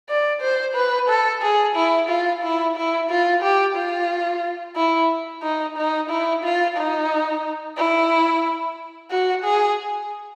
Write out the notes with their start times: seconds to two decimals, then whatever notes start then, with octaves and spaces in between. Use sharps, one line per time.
0.09 D5
0.41 C5
0.75 B4
1.09 A4
1.42 G#4
1.76 E4
2.09 F4
2.43 E4
2.77 E4
3.10 F4
3.42 G4
3.76 F4
4.76 E4
5.43 D#4
5.77 D#4
6.10 E4
6.44 F4
6.77 D#4
7.77 E4
9.11 F#4
9.44 G#4